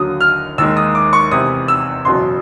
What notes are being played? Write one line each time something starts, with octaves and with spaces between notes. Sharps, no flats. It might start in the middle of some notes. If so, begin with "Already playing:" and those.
Already playing: D#2 D3 F#3 D#6
F6
D#2 D#3 G#3 E6
D#6
D6
C#6
E2 C3 E3 D#6
E6
F#1 E2 B2 F#3 C6